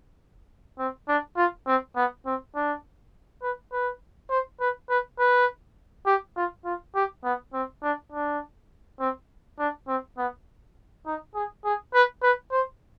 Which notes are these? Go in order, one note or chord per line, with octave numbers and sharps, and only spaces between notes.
C4
D4
F4
C4
B3
C4
D4
B4
B4
C5
B4
B4
B4
G4
F4
F4
G4
B3
C4
D4
D4
C4
D4
C4
B3
D#4
G#4
G#4
B4
B4
C5